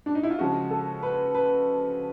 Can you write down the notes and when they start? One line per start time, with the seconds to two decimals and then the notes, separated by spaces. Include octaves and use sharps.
0.06 D4
0.15 D#4
0.23 E4
0.30 F4
0.39 C#3 F3 G#3 F#4
0.70 A4
1.03 B4
1.35 B4